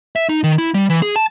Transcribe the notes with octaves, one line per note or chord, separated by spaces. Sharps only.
E5
D#4
D#3
E4
G3
E3
G#4
A5